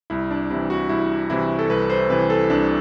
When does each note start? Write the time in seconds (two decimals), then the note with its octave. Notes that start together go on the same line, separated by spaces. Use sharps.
0.10 C2 E4
0.31 D4
0.51 C3 E3 E4
0.70 F#4
0.89 C2 E4
1.30 C3 E3 E4
1.59 A4
1.70 C2 B4
1.90 C5
2.09 C3 E3 B4
2.30 A4
2.50 C2 D4